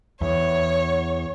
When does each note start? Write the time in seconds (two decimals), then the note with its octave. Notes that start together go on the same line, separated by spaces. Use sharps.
0.21 E2 C#5